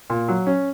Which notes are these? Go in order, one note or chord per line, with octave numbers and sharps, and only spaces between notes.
A#2
F#3
C#4